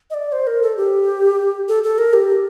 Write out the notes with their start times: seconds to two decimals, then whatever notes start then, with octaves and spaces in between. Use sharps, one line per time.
0.10 D#5
0.14 D5
0.32 C5
0.47 A#4
0.63 A4
0.77 G4
1.69 A4
1.84 A4
1.98 A#4
2.13 G4